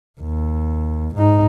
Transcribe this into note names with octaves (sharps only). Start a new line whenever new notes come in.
D#2
G#2 D#4